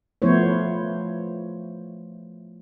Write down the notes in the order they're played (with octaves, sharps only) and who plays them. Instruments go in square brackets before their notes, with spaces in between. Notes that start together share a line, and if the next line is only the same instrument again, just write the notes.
[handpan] F3 A3 B3 E4 C5 C#5